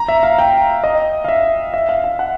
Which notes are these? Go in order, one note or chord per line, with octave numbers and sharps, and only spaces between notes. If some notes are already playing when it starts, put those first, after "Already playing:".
Already playing: A#5
E5
F5
G5
D#5
F5
E5
E5
F5
F5
F#5